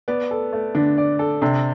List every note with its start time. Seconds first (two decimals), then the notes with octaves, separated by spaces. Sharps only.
0.08 B3 D5
0.31 A4
0.53 A3
0.75 D3 D4
0.98 D5
1.19 A4
1.41 C3 D4